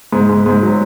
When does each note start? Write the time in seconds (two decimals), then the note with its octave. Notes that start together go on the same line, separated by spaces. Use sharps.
0.13 G#2
0.29 G#2
0.46 G#2
0.62 F#3